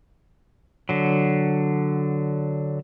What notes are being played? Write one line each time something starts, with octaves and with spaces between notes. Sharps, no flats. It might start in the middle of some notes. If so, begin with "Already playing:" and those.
D3 F#3